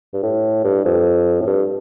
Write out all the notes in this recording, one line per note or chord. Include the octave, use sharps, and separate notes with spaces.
G2
A2
G2
F2
A2
G2